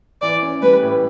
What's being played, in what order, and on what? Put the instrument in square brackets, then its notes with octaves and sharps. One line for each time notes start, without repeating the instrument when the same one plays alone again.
[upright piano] E3 [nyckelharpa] D5
[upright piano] C#4
[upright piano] G3 [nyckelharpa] B4
[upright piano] A2